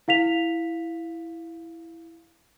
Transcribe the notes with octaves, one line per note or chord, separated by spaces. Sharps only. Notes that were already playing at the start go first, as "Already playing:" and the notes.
E4 F5 B6 F7